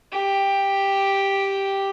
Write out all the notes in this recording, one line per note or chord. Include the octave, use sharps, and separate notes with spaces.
G4